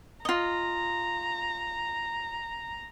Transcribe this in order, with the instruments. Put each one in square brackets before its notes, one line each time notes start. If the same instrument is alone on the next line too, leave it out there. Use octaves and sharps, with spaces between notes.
[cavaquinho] F4 D#5 [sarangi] A#5